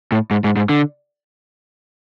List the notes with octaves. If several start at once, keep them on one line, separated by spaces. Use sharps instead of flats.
A2
G#2
G#2
G#2
D3